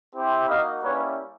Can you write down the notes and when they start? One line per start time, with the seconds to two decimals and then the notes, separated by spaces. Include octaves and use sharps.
0.15 C4 E4 G4
0.48 A#3 D#4 F#4 D#5 F5
0.82 G3 A#3 C#4 E4 B4 C#5